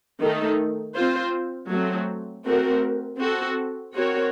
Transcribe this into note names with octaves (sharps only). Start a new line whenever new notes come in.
D#3 A3 D#4 A4
C4 F4 C5
F#3 A3 C4
A3 C4 F#4 A#4
C4 F#4 A4
C4 F#4 A#4 C#5